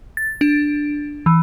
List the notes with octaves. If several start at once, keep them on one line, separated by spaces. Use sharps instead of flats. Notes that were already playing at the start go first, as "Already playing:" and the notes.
A6
D4
E3